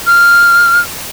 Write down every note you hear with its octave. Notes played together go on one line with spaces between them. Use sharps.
F6